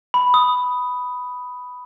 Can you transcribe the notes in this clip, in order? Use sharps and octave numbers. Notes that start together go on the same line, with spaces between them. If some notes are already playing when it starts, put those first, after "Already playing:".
B5
D#6